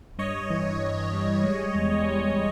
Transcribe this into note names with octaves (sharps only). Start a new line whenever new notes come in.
G2 C#5 D#5
E3
E3
G3
G#3
E2
G#3